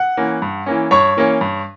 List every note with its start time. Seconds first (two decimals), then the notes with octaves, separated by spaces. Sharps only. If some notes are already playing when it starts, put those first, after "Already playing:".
Already playing: F#5 F#6
0.17 E3 A#3 C#4
0.42 G2
0.66 E3 A#3 C#4
0.91 G2 C#5 C#6
1.17 E3 A#3 C#4
1.41 G2